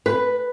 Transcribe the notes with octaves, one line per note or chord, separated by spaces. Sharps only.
B4